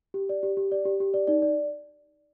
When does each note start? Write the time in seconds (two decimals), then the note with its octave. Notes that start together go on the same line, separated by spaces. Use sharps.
0.14 G4
0.29 D5
0.43 G4
0.57 G4
0.72 D5
0.85 G4
1.00 G4
1.14 D5
1.27 D#4 D5
1.42 D5